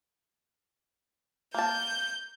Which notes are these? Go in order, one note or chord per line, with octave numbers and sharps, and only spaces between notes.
A#3 A5 G6